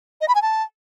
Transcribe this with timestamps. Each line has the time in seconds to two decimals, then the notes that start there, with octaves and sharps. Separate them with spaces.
0.21 D#5
0.28 B5
0.35 G#5
0.42 A5